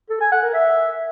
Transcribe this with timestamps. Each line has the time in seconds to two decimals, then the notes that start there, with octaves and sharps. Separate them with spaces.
0.10 A4
0.21 G#5
0.32 F#5
0.43 A#4
0.54 E5